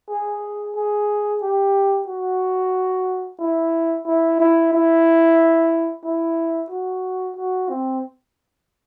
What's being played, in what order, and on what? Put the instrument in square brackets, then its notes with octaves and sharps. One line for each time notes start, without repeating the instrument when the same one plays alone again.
[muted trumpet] G#4
G#4
G4
F#4
E4
E4
E4
E4
E4
F#4
F#4
C4